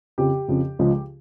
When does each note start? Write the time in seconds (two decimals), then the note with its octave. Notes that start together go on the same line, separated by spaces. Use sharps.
0.18 F2 C#3 F3 G4
0.48 F2 C#3 F3
0.79 C#2 C#3 F3 G#3